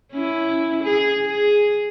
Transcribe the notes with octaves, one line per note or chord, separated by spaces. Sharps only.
C#4 E4
G#4
G#4